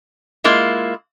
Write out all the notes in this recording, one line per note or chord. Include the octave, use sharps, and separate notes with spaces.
G#3 A#3 E4 F4